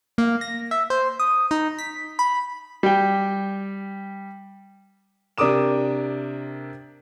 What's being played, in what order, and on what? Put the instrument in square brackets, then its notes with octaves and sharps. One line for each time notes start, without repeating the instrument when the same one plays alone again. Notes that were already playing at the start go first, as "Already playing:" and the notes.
[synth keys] A#3
A#6
E5
C5
D#6
D#4
B6
B5
[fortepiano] G3 G5
[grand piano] C3 D4 A#4 D6 D#6 E7